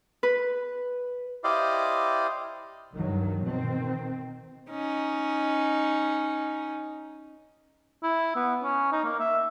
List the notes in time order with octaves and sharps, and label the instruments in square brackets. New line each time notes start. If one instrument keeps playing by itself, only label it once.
[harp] B4
[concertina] E4 G4 C5 D5 D#5 F5
[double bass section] C#2 G2 D#3 F#3
B2 D#3 C4
[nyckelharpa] C#4 D#4
[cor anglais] E4
B3
C#4
D#4
A#3
E5